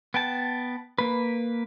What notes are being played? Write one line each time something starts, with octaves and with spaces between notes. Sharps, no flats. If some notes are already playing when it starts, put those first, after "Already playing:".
B3 G5 A5
A#3 B4